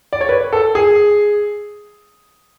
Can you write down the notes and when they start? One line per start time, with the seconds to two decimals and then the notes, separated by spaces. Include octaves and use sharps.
0.13 D5
0.21 C#5
0.29 B4
0.53 A4
0.75 G#4